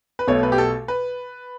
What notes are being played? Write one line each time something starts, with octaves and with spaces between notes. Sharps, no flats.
B4
B1 B2 A3 C#5
B4
G4
A4
B4